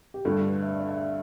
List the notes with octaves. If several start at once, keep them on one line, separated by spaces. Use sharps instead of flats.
G4
G2 D3 A3 A4
B4
E5
D5
D5
E5